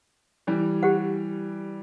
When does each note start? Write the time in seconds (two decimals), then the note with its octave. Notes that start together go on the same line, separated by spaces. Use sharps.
0.47 E3 G3
0.83 G4 C5 F#5